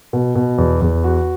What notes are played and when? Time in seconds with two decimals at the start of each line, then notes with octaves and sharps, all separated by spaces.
0.13 B2
0.35 B2
0.58 E2
0.81 E2
1.04 F#4